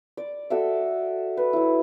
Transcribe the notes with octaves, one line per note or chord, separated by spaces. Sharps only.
D5
F#4 A4 D5 E5
B4
F#3 E4